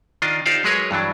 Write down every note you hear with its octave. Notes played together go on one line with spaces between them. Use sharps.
D#3 D4 F4 D#5
D#4 F4 G4 C5 D5 F5
F#3 G#3 G#4 A#4 B4 C#5
G2 E3 F#3 D4